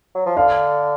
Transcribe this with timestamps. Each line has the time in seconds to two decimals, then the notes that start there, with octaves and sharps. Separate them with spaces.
0.15 F#3
0.26 F3
0.37 D3 F5